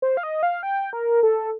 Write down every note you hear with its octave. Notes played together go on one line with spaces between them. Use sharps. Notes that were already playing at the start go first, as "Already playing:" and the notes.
C5
F5
D#5
F5
G5
A#4
A4